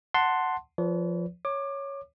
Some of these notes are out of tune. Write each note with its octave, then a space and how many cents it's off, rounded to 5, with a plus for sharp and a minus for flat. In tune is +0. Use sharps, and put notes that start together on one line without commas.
F#5 +0 A5 +10 C6 +0
F3 +0 B4 +0 D5 -45
C#5 +0 D6 +25